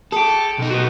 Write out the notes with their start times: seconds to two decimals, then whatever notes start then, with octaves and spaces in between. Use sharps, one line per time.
0.12 G#4 A4 G5
0.58 B1 D#4
0.70 F#4 B4